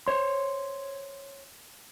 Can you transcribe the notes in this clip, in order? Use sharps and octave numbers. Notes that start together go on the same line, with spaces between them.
C5 C#5 C6